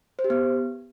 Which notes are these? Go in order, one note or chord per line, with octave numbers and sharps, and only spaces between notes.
C5
G4
B3